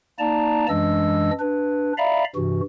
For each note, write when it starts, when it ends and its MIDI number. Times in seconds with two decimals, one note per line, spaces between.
0.19 0.66 58
0.19 0.66 63
0.19 0.66 74
0.19 0.66 81
0.19 0.66 82
0.69 1.31 42
0.69 1.31 52
0.69 1.31 56
0.69 1.31 62
0.69 1.31 75
0.69 1.31 88
1.40 1.93 62
1.40 1.93 71
1.98 2.24 74
1.98 2.24 76
1.98 2.24 77
1.98 2.24 82
1.98 2.24 83
2.36 2.61 43
2.36 2.61 48
2.36 2.61 52
2.36 2.61 66